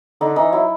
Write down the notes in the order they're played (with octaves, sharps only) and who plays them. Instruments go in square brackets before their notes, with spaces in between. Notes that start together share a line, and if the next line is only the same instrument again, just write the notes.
[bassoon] D3 [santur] D#4
[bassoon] E3 [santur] D#4
[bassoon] F#3 [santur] E4